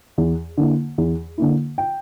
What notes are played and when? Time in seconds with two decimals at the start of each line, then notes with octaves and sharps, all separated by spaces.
0.18 E2
0.57 D3 A#3 E4
0.98 E2
1.38 D3 A#3 E4
1.78 G5